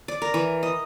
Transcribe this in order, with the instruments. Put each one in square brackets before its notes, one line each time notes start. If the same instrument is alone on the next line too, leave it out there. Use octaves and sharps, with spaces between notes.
[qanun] D5
A#4
E3
D#5